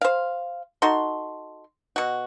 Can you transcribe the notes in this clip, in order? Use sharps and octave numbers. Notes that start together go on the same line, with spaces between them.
C5 F5
D#4 F#4 A4 C6
B2 F#4